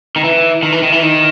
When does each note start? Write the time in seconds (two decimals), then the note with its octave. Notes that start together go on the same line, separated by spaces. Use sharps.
0.16 D#3
0.24 E3
0.63 D#3
0.72 E3
0.83 D#3
0.92 E3
1.03 D#3